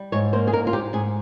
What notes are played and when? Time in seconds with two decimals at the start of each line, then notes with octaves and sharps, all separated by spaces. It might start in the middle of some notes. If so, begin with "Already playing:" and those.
Already playing: G3
0.12 G#2 C#5
0.33 A#3 C5
0.47 G#4
0.53 G#2 A#4
0.67 F4
0.73 G#2 G4
0.93 G#2 G#4